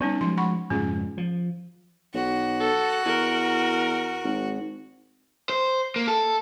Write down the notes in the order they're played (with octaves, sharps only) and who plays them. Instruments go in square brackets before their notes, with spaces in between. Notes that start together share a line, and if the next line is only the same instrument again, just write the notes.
[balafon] G3 C#4 D#4 [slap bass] B3
[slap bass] F3 F#3 G#3 [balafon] C6
[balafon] F#5 B5 C#6
[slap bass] F2 G#2 C#3 [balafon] C#4 F4 G#4
[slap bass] F3
[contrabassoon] B1 [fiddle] F#4
[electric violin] A4
[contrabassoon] E2 [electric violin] A#4
[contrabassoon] G#1
[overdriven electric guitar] C5
A#3
A4